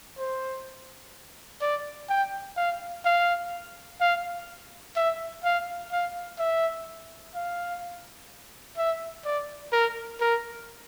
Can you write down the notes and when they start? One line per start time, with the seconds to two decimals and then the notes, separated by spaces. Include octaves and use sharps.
0.18 C5
1.61 D5
2.09 G5
2.56 F5
3.05 F5
4.00 F5
4.96 E5
5.44 F5
5.92 F5
6.39 E5
7.35 F5
8.77 E5
9.25 D5
9.72 A#4
10.20 A#4